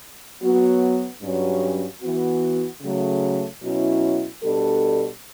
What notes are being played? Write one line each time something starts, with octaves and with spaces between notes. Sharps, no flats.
F#3 B3 F#4
G2 F#3 C#4
E3 B3 F#4
C#3 F#3 A3
B2 F#3 C#4 E4
B2 G3 D4 A4